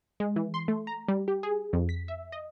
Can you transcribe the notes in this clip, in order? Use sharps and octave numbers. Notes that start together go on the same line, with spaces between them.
G#3
E3
C6
A3
A#5
G3
G4
G#4
F2
B6
E5
D#5